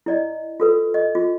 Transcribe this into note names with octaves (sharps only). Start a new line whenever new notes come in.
E4 D5 D#5
F4 A4 B4
D#5
F4